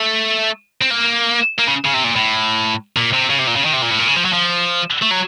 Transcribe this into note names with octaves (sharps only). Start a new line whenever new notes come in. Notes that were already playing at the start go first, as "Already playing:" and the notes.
Already playing: A3
C4
A#3
A#3
C#3
C#3
C3
A#2
A2
A#2
C3
C#3
C3
A#2
C#3
D#3
C3
A#2
A2
A#2
C#3
F3
F#3
F3
A3
F#3